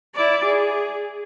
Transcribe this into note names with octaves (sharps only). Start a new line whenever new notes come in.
E4 D5
G#4